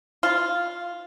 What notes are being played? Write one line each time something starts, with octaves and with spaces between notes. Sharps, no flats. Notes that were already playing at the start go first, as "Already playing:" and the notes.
F4